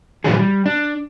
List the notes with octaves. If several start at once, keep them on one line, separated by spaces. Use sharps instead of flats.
A2 D3 E3 F#3 G3 G#4
G3
D4